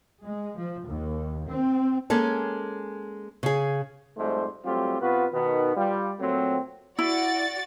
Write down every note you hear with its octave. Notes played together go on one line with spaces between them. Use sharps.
G#3
F3
D#2
C4
G#3 A#3 C#4 A4
C#3 G#4
F2 G#2 G3 A3 C5
F#3 G3 A3 C4 F4 G4
C3 B3 F4 F#4 B4
B2 D#3 B3
G3 F4
A#2 F#3 A3 C4
E4 F#4 D5 A6